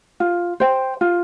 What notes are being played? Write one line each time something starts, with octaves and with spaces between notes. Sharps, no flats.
F4
C5 G5
F4